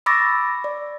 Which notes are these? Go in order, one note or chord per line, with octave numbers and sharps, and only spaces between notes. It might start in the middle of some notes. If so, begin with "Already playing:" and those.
B5 C#6 D6 E6 A6 A#6
D5